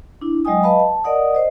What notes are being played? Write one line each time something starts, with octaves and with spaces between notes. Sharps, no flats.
D4 E4
F#3 G#3 D#5 G5 G#5 D#6
B4 D#5 F5 A5 B5
A5
A#4 D5 D#5 F#5 D#6
C5 D#5